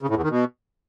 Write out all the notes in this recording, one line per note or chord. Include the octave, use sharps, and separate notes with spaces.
C#3
A2
E2
D#3
B2